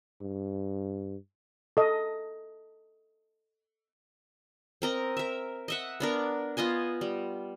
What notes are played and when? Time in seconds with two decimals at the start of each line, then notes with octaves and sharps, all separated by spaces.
0.22 G2
1.77 A4 D#5
4.82 C4 A#4 D#5
5.17 A#4 E5
5.68 D#5 E5 F#5
6.00 B3 D4 A#4
6.57 B3 F4 D#5 G#5
7.01 G3